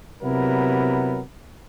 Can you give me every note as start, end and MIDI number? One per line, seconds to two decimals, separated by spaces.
0.22 1.21 48
0.22 1.21 54
0.22 1.21 59
0.22 1.21 64
0.22 1.21 70